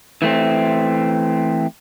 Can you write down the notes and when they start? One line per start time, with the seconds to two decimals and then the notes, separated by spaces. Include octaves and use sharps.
0.22 E3 A3 C4